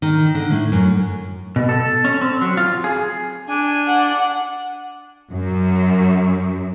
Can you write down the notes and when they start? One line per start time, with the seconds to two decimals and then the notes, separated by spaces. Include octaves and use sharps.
0.02 D#3
0.35 D3
0.51 A2
0.72 F#2
1.56 B2
1.69 A4
2.05 C#4
2.21 C4
2.41 F#3
2.57 F4
2.84 G#4
3.49 D4 G#5
3.88 F#5
5.32 F#2